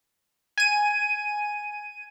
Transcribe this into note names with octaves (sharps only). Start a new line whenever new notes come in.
G#5 D#7